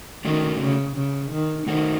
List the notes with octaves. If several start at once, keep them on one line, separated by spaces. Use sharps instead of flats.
D#3 A3 C#4 F#4 A4
C#3
C#3
D#3
D#3 A3 D#4 F#4 A4 C5